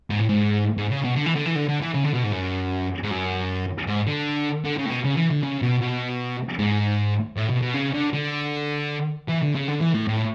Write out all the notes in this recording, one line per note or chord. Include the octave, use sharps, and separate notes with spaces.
G#2
A2
G#2
G#2
C#3
B2
D3
E3
D3
E3
D3
D3
E3
C#3
D3
B2
G#2
F#2
G#2
F#2
G#2
D3
D3
C#3
A2
B2
C#3
E3
D3
C#3
B2
B2
G#2
A2
B2
B2
C#3
D3
D3
E3
D3
C#3
D3
E3
A2
A2